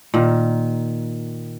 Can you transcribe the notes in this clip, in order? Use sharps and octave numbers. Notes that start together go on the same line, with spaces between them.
A#2 D#3